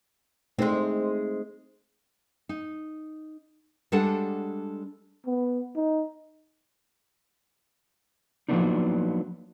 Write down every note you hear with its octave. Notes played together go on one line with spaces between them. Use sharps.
G#3 A3 C4 D#4 C5
D#4
G3 G#3 D4 A4 F#5 A5
B3
D#4
F3 F#3 A#3 B3 D4 D#4